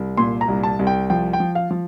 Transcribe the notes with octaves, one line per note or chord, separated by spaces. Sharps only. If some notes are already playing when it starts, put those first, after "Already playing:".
Already playing: C2
A#2 C6
A#5
C2
A5
C2
G5
F3 G5
G5
F3
F5
F3